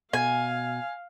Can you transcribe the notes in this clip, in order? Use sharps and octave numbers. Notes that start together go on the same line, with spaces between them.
B2 F5 G#5